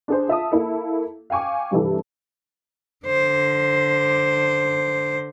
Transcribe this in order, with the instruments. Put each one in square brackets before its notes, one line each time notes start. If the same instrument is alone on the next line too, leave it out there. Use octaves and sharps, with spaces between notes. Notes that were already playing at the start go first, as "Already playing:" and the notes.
[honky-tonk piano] D4 G#4 C5
F4 E5 A5 D#6
A#3 E4 A4
F5 G5 G#5 C#6 D6
G2 C3 E3 E4 A4
[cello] D3 C5